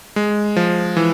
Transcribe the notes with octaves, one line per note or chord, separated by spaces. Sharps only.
G#3
F3
E3